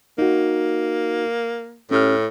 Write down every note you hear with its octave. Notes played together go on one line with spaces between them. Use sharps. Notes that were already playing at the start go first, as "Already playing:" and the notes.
A#3 D#4 F#4
A2 C#4 G4 F6